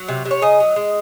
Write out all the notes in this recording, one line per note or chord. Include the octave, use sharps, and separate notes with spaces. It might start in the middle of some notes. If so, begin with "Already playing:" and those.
Already playing: F#3
C3
C3
C#5
C#3 D#5
F#3
G#3